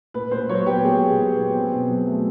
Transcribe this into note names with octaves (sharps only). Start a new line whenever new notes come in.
A#2 B4
A#2 C5
F#3 C#5
B3 G4
A#2 G#4
A#2
F#3
B3
C4
B2
F#3
A3